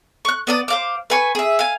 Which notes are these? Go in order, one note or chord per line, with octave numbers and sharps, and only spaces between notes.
C#6 F#6
B3 D5 D#6
C5 F5 D6
B4 G#5 C#6
G#4 E5
F5 G#5